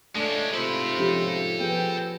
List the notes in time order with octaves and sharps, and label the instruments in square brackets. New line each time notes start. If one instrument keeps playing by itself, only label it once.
[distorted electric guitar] G#3 C#4 [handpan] A3 [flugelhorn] D4
[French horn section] G#2 C3 F4 [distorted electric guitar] A4 B5 [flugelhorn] C5
[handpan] F3 C#4 G4
[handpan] F3 B3 G#4 [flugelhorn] G5